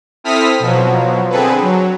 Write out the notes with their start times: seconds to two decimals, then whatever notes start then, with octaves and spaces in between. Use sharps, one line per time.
0.24 C4 E4 A4 D#6 F6 B6
0.60 B2 F3 F#3
1.30 D3 C4 G#4 A4 B4
1.61 F#3